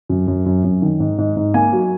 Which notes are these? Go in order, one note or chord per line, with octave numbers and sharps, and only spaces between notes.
F#2
F#2
F#2
F#2
D#3
G#2
G#2
G#2
A#3 G#5
F#3